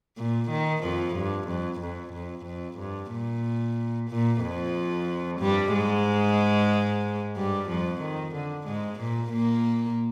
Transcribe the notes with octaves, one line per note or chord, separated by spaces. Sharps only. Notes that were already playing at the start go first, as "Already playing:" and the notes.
A#2
D#3
F2 F3
G2
F2
F2
F2
F2
G2
A#2
A#2
F2 F3
G2 G3
G#2 G#3
G2 G3
F2 F3
D#3
D3
G#2 G#3
A#2 A#3
A#2 A#3